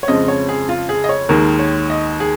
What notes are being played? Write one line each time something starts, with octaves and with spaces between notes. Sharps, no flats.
C#5
F2 C#3 F3 G#3 D#5
C#5
G#4
F4
G#4
D#5
C#5
D#2 D#3 G#3 A#4
C#5
D#5
G#4